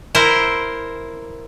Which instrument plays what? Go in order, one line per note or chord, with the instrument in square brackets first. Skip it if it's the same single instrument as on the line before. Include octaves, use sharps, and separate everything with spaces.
[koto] E4 A#4 C5